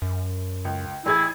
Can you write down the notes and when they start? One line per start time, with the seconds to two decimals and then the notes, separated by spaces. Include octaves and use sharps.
0.02 F#2
0.65 C#2
1.06 A1 E4 G#4 G#6